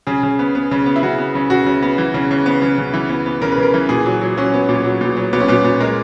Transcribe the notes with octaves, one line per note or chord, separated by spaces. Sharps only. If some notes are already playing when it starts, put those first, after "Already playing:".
C#3 G#4
C#3
B3
B3
C#3
B3
E4
C#3 F#4
B3
C#3
C#3 F#4
C#3
B3
E3
C#3
C#3
B3
C#3
C#3
E3
B3
B3
C#3 A#4
B4
C#3 A#4
E3
A#2 G#4
F#3
F#3
F#3 C#4
B3
A#2
F#3
A#2
F#3
A#2 B3
C#4
A#2 B3
A#2
G#3 A#4